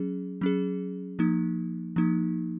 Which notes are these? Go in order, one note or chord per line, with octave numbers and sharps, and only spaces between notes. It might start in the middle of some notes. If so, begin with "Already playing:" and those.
Already playing: F#3 C#4 G#4
F#3 C#4 G#4
F3 A#3 D#4
F3 A#3 D#4